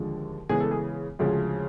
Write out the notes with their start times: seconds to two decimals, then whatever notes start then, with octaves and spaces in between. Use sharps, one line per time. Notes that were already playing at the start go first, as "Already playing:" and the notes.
Already playing: D#2 D3 F3 G#3
0.49 C#3 E3 G#3 B3 G#4
0.60 A4
0.71 G#4
1.19 D2 C#3 F3 G#3